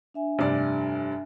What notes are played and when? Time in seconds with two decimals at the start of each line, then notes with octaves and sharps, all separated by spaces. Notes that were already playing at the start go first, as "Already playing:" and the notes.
0.14 D4 E5 G#5
0.39 F1 G2 D5